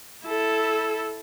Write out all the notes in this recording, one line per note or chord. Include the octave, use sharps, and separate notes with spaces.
E4 A4